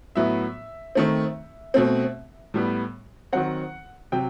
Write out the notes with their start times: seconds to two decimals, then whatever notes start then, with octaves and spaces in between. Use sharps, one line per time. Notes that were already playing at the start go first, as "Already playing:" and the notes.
0.16 A2 F#3 B3 E5
0.95 D#3 A3 C4
1.74 B2 A3 C4
2.54 A2 G3 B3
3.33 D#3 F#3 C4 F#5
4.12 C3 F#3 G5